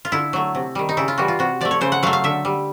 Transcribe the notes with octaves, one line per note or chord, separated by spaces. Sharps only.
F4
D3 E4
F#3 A3
C3
D#3 G3
D#4
C#3 E4
F4
E3 G3 F#4
F4
C3 F#4
F3 A3 D5
C#5
C#3 C5
F#5
F#3 A3 F5
F5
D3 E5
G3